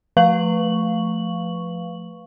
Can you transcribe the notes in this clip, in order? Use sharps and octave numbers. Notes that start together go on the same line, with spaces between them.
F3 A3 B4 F5 C#6 F#7